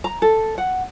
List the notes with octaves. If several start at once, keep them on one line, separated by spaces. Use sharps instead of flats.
A#5
A4
F#5